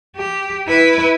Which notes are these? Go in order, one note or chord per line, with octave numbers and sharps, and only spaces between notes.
G4
E4 B4